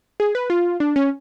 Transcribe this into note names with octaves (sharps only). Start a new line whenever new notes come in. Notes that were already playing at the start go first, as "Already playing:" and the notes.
G#4
B4
F4
D4
C#4